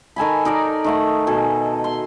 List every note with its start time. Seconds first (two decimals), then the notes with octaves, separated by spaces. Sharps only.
0.16 D#3 A4 G#5 B5
0.45 D#4 A#4 D5 A#5
0.84 D#3 A3 F#5
1.27 B2 A4 G#5
1.84 C6